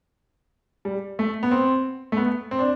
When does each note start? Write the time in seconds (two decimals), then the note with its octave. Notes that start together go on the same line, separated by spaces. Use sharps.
0.85 G3
1.19 A3
1.43 B3
1.51 C4
2.12 A3
2.17 B3
2.51 C4
2.59 D4